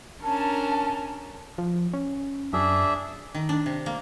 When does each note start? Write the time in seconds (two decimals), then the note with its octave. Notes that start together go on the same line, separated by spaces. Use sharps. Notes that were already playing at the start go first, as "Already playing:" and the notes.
0.24 C#4 D4 A#4 A5
1.58 F3
1.93 C#4
2.53 F#2 D4 G#4 E5
3.34 D#3
3.49 D4
3.66 C3
3.86 A#3